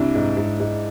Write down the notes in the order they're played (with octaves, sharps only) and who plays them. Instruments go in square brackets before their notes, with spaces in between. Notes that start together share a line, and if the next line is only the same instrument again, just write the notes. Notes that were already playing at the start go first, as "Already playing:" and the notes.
Already playing: [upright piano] C2 D4 E4
G#2
G#2
G#2